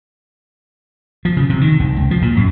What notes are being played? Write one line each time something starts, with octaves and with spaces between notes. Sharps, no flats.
F3
C#3
C3
D#3
C2
C#2
F3
A#2
F#2